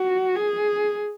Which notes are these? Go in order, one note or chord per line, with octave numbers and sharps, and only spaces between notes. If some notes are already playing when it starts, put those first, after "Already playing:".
Already playing: F#4
G#4